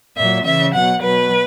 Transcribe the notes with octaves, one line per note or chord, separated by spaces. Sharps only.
A#2 F#3 E5
C#3 E3 E5
B2 F#3 F#5
B2 F#3 B4